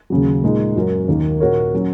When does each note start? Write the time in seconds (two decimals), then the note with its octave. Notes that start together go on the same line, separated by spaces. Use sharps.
0.10 D#2 C#3 F#3
0.43 A#2 G#3 D#4
0.76 F#2 F#3 C#4 F#4 A#4
1.08 D#2 D#3 A#3
1.40 A#2 A#3 F#4 A#4 C#5
1.74 F#3 C#4